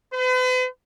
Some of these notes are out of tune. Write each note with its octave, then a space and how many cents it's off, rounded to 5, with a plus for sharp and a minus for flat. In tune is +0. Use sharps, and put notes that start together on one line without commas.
B4 +45